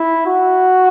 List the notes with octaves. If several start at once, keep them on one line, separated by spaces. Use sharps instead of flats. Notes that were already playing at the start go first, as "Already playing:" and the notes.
Already playing: E4
F#4